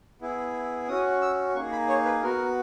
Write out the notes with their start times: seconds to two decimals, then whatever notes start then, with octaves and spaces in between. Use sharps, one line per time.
0.21 B3 E4 G#4
0.88 C#4 F#4 D#6
1.22 E6
1.55 A#3 D#4 G#4 C#6
1.72 B5
1.88 C#5
2.05 B4
2.22 B3 F#4 A#4